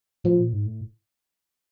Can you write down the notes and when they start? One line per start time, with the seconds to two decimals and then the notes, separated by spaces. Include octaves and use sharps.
0.24 A2 F3
0.38 A#2
0.53 G#2
0.66 A2